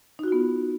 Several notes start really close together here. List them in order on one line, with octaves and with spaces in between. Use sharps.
D#4 F#4 F4 B3